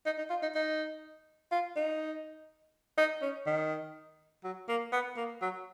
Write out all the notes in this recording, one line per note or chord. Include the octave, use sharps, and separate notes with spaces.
D#4
D#4
F4
D#4
D#4
F4
D#4
D#4
C#4
D#3
F#3
A#3
B3
A#3
F#3